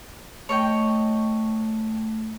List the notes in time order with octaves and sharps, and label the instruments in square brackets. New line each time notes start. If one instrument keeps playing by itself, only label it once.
[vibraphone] A3 [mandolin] C#5 D#5 G5